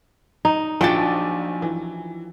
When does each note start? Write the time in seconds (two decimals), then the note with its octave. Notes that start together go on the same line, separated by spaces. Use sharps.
0.45 D#4
0.81 A#1 F3 F#3 D4 G5 A6
1.62 E3